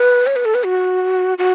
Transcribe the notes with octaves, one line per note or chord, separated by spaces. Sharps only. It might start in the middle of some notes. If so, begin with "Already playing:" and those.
Already playing: B4
C#5
B4
A4
B4
F#4
F#4